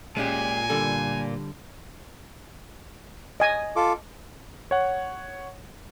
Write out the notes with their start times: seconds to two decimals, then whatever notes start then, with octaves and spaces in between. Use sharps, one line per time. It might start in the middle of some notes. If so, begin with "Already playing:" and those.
0.17 A#2 G#3 C#4 G4 G#5
0.70 D3 G3 A4
3.40 D#5 G#5
3.76 F4 A4 D6
4.71 C#5 F#5